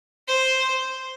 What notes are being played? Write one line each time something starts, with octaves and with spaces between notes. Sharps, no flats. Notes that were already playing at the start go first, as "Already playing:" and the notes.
C5